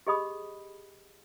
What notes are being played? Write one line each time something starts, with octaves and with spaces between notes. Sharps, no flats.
G4 G#4 D#5 B5 D#6